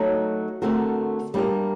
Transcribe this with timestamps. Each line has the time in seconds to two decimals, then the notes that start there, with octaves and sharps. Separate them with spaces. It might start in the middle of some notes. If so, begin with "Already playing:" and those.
Already playing: F#3 A3 D#4
0.62 D3 A3 C4 F#4 A#4
1.34 G3 A#3 D4 G4 A#4